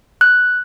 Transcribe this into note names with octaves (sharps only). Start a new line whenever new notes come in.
F#6